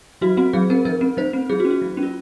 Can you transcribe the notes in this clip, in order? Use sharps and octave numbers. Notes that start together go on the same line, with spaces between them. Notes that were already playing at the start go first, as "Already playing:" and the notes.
F#3 F#4
C4 F#4
F#3 G#4
C4 A#4
F3 A#4
C4
F3 C5
C4
F#3 G#4
F#4
C#4
F#4
F#3
C#4
F4